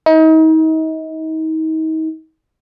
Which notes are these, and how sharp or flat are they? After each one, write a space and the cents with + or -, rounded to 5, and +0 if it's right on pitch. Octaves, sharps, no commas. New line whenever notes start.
D#4 +35